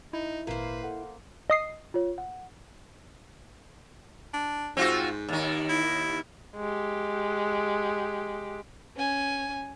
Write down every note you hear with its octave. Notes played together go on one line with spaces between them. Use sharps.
D#4 E4
G#1 A#2 A#3 B4 C5 C7
A4 F#5
D#5 D#6 C7
F4 C#5
F#5
D4
G#2 C4 F4 F#4
D#2 D#3
E4
G#3 G4
C#4 G#5